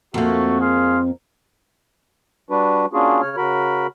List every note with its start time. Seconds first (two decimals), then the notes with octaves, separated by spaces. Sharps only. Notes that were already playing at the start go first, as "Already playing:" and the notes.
0.14 F2 A3 A#3 F#4
0.60 G#4 F5 C6
2.50 G3 D4 F#4 B4
2.93 A#3 C#4 D4 F4 F#4 G#4
3.21 C#3 C#5 F6
3.37 C#3 F#4 A#4 B5